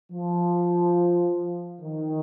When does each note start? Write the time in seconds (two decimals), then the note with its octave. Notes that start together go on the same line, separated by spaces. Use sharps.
0.11 F3
1.81 D#3